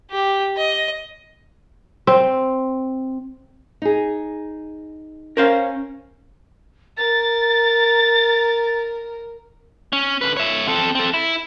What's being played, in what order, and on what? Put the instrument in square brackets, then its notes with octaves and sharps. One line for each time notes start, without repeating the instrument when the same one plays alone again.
[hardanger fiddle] G4
D#5
[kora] C4
[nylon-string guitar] D#4 G#4
[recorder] C#4 [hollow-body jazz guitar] A#4 C5 F5
[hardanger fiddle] A#4 [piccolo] A6
[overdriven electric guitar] C#4
D3 B4
C#5 E5
C4 A4
C4 A4
E4